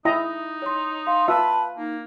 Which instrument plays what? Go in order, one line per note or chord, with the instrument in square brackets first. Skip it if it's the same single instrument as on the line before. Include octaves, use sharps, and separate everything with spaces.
[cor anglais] D#4 [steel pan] E4 D#5 A#5
[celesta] C#5 C6
[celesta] F5 [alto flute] C6
[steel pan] F4 E5 [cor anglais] B4 [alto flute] A5
[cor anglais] A#3 [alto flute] D#4